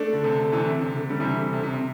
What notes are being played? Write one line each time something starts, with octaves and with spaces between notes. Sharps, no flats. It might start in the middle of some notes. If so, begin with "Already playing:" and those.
Already playing: A3 D4
D3
C3
D3
C3 E3
D3
C3
D3
D3 G3
C3 E3
D3
D3
C3
C3
C3